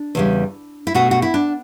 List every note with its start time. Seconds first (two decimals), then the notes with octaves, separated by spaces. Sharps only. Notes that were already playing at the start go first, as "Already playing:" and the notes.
Already playing: D4
0.15 E2 C#3 G3
0.87 E4
0.94 B2 A3 F#4
1.11 F#4
1.22 E4
1.34 D4